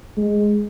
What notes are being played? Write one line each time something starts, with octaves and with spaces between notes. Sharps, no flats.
G#3